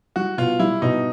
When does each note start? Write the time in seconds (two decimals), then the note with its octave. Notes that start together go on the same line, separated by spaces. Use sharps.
0.16 G3 F#4
0.38 B2 F4
0.59 G3 E4
0.82 B2 D#4